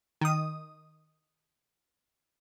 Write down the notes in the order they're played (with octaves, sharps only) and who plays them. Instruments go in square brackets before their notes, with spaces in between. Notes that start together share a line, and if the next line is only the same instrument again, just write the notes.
[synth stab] D#3 D#6